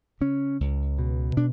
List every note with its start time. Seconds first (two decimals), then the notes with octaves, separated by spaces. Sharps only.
0.21 C#3 C#4
0.60 C#2
0.99 B2
1.37 B2 D4